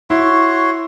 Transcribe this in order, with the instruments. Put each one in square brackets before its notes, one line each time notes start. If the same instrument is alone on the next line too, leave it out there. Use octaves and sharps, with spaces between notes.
[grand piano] E4 [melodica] F#4 C#5 C6